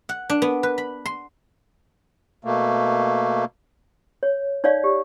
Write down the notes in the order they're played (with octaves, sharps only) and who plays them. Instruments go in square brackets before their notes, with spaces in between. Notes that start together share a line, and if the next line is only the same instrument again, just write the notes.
[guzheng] F#5
D4
B3
B4
B5
C6
[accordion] B2 A3 A#3
[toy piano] C#5
D#4 C#5 D5 F5
G4